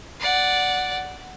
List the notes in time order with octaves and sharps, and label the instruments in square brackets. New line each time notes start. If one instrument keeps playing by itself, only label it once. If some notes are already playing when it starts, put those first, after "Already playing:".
[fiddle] D5 F#5